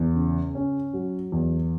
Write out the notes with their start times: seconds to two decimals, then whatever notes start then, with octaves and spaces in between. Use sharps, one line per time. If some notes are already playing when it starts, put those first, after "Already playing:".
Already playing: E2
0.15 C#3
0.55 C#4
0.93 F#3
1.32 E2